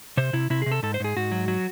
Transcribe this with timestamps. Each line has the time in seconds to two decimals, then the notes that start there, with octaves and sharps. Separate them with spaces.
0.17 C3 C5
0.33 C3 E4
0.50 C3 E4
0.62 C3 G#4
0.72 A4
0.82 G#2 A4
0.94 C5
1.00 G#2 G#4
1.16 G#2 F#4
1.32 F#3
1.48 F#3